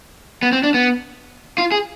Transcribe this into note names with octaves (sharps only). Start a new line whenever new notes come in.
B3
C4
D4
B3
F4
G#4